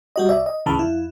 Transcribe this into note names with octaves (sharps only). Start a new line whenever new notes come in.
G3 F#4 D#5
C2 D5 E5
D#5
G#1 D2 C#3 E3 A5 B5
F2 E4